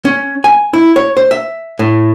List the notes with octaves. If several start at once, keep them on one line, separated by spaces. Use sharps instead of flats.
C#4
G#5
E4
C#5
C5
E5
A2